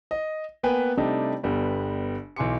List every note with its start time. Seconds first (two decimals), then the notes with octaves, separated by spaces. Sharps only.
0.11 D#5
0.63 A#3 B3 B4 G5 G#5
0.97 C3 G3 A3 D4 D#4
1.43 G1 G3 B3
2.36 B1 E3 G#5 C6 D6 C#7